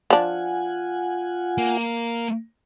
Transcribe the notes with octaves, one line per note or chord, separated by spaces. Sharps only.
F3 D4 F4 F#5 G#5
A#3